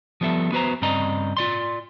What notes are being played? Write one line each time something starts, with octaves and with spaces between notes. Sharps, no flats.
F3 G3 B3 A4 E5
B3 F#4 B4 C5 A#5
G2 C#3 C4 D5 D#5 A#5
F4 D5 C6